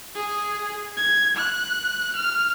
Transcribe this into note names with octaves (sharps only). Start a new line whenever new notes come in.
G#4
G#6
F#6
F6